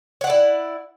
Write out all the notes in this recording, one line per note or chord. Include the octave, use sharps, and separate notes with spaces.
E4 C#5 D5 F#5